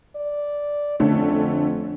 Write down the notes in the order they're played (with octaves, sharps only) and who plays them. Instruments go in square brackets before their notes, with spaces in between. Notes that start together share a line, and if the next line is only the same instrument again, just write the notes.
[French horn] D5
[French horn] F2 [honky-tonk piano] D3 A3 C#4